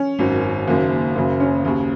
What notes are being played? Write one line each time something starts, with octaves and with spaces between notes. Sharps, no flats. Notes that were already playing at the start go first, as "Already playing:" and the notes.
Already playing: C#4
G#1 F#2 D#3
F#1 F#2 D#3 A#3
F#1 F#2 C#3 A#3
C#4
D#2 C#3